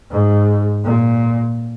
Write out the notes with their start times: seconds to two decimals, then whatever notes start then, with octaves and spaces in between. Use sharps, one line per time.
0.11 G#2
0.84 A#2